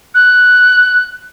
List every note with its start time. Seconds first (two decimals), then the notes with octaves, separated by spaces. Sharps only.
0.14 F#6